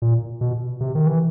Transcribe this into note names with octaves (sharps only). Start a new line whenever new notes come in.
A#2
B2
C3
D#3
E3